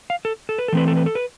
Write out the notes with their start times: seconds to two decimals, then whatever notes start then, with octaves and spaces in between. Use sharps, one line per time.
0.10 F5
0.25 A4
0.49 A4
0.58 B4
0.68 A4
0.72 E3 A3 C4 B4
0.88 A4
0.96 B4
1.06 A4
1.15 B4